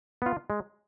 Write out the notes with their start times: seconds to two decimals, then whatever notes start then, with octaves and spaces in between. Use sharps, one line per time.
0.22 B3 F4
0.50 G#3